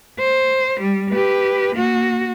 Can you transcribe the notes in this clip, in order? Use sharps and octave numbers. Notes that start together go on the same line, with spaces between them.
C5
G3
G4 B4
A#3 F#4